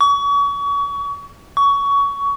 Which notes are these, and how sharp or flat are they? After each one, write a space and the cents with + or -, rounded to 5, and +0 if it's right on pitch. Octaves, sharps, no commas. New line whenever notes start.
C#6 +35
C#6 +20